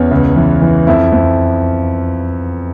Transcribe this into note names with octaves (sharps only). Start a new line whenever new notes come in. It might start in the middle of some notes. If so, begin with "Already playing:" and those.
Already playing: E2 C#4
C#2
E3
E3
F2 E4
F2